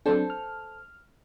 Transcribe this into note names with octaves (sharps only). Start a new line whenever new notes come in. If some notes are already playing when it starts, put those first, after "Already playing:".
F#3 C4 D4 A4 C5
F6